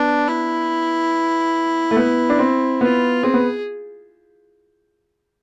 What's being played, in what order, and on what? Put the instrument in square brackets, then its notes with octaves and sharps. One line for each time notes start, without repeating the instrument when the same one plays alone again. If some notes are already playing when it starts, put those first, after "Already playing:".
Already playing: [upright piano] B3 [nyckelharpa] D4
[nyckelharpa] E4
[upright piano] A3
B3
D4
C4
[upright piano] B3 [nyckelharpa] F4
[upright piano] C4 [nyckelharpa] G#4
[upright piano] B3